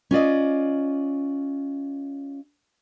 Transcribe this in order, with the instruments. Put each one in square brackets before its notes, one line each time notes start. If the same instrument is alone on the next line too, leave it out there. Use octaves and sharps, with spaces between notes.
[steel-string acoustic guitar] C#4 F4 D5 D#5